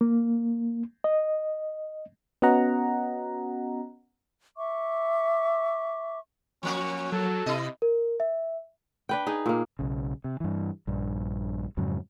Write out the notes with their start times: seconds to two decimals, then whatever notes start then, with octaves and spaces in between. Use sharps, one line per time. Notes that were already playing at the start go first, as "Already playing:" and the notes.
0.01 A#3
1.04 D#5
2.42 B3 C#4 F#4 D#5 F#5 A#5
4.57 E5 C#6 D6
6.63 F3 A#3 C#4 F#4
7.12 F#3 A4
7.46 C3 E4 D#5
7.82 A#4
8.20 E5
9.09 D4 B4 G5
9.27 D#4 G#4
9.46 A#2 A#3
9.79 B1 C#3
10.24 C3
10.40 G2 E3
10.87 A#1 G2
11.77 F2 G#2 C#3 F#3